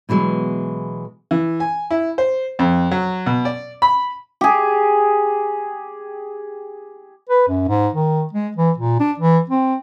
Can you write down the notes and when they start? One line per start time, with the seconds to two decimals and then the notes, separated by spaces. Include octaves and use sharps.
0.09 B2 E3 F#3 G#3
1.31 E3
1.60 G#5
1.90 E4
2.18 C5
2.59 F2
2.91 F#3
3.26 B2
3.45 D5
3.82 B5
4.41 G4 G#4
7.29 B4
7.48 F#2
7.68 G#2
7.94 D#3
8.33 G#3
8.57 E3
8.78 A#2
9.00 D4
9.20 E3
9.50 C4